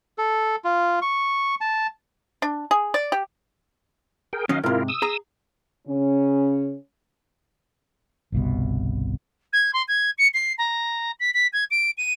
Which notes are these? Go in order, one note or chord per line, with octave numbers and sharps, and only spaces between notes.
A4
F4
C#6
A5
D4
G#4
D5
G4
G#4 A#4 G5
D#3 F#3 C#4 D#5 F5
G#2 C3 E4 F4 A#4
D#6 E6
G#4 A#5
C#3 C#4
G1 C2 B2
G#6
C6
G#6
C#7
C7
A#5
B6
B6
G#6
D7
D#7